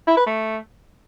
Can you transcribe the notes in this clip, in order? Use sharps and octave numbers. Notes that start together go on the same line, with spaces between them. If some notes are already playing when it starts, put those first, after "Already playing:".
E4
B4
A3